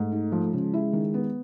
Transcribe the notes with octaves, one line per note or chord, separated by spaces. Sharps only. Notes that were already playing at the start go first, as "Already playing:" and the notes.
Already playing: G#2 A3
D#4
F3
C#3 G#3
E4
D#3
B3